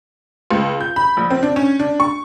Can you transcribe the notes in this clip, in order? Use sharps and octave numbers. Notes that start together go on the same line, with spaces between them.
C#2
G6
B5
A#1
C4
D4
C#4
D4
C#6